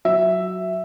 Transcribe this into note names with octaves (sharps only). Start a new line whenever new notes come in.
F#3 E5